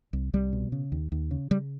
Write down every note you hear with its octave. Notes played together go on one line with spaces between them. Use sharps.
C2
C2 G3
B2
C#3
D#2
D#2
C#3
C#3 G3